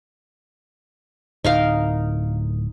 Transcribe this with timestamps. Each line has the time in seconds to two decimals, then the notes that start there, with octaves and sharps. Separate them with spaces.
1.44 D1 D#4 A#4 F5